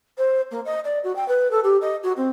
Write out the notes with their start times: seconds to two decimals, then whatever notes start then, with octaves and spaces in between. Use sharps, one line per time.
0.18 C5
0.51 A#3
0.65 D#5
0.84 D5
1.03 F#4
1.16 G5
1.28 B4
1.51 A4
1.63 G4
1.81 D#5
2.03 F#4
2.16 C4